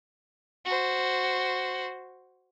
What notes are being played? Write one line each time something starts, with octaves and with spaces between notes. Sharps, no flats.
F#4 C5